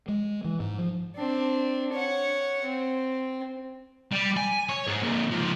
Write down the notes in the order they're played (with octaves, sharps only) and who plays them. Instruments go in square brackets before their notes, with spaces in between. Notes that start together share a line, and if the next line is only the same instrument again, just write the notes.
[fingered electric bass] G#3
E3
G#2
F3
[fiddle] C4 D4
C#5 F#5
C4
[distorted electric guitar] G3
G#5
C#5
G#2
A#2 D3
C#2 F3